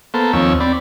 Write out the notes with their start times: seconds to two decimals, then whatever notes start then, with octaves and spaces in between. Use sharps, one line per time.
0.14 A#3 B3 A4 C5
0.33 D#2 F3 C4 C#5 E6
0.60 C4 D5 B5